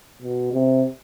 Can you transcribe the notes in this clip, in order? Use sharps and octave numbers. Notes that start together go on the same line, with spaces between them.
B2
C3